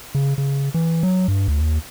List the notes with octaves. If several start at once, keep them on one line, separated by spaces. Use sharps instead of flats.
C#3
C#3
E3
F#3
G2
D2
D#2